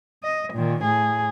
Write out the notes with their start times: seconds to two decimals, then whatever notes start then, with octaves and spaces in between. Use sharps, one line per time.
0.23 D#5
0.53 A#2 D#3
0.84 A2 G#4